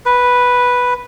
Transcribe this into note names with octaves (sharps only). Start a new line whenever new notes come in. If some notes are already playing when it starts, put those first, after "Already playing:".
B4